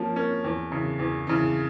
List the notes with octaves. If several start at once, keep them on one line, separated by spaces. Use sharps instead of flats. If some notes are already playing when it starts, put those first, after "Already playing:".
Already playing: F3 A#3 C#4
A#3 C#4
E2
C#3 E3
E2
C#3 E3